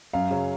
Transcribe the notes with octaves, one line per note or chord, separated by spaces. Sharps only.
F#2 F5
C#3 F#3 C#4